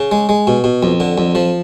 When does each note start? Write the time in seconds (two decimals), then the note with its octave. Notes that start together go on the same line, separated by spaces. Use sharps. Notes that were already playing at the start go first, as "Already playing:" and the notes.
Already playing: C#3
0.11 G#3
0.29 G#3
0.47 B2
0.64 B2
0.83 F2
1.00 D3
1.18 F2
1.35 F3